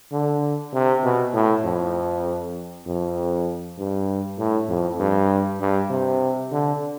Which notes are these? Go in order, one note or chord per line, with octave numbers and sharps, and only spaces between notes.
D3
C3
B2
A2
F2
F2
G2
A2
F2
G2
G2
C3
D3